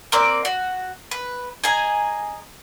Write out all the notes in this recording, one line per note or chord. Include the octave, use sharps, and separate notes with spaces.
A#3 C4 D5
F#4
B4
G#4 D#5 G#5 A#5